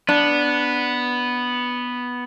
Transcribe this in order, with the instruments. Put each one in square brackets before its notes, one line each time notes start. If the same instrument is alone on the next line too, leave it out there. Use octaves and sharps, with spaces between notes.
[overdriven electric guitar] B3 [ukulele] D4